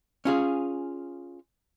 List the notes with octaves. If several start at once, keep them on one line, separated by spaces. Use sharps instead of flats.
C#4 F4 G#4